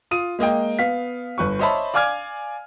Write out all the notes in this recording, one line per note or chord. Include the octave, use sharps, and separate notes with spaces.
F4 D#6 D#7
G#3 A#3 D#5 G5
B3 F5 B6
G1 B4 C#6
C5 C#5 D#5 E5 A5 B5
D5 F5 G#5 D6 F6 G#6